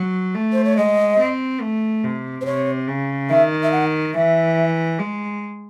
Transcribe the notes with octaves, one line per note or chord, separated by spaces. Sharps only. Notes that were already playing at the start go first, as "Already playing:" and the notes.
Already playing: F#3
A3
C5
C#5
G#3 D#5
C4
A3
C3
C5
C3 C#5
C#3
D#3 E5
E5
F#5
E3 E5
G#3